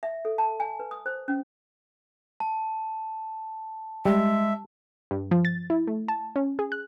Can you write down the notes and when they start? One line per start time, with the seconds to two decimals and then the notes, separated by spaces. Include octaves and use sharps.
0.03 E5
0.25 A4
0.38 A5
0.60 G#5
0.80 B4
0.91 D#6
1.06 C5
1.28 C#4
2.40 A5
4.05 G3 G#3 E5
5.11 G2
5.31 F3
5.45 A6
5.70 E4
5.87 A3
6.08 A5
6.36 C#4
6.59 G#4
6.72 F#6